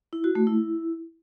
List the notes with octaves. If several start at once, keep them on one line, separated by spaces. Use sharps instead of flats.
E4
F#4
A3
E4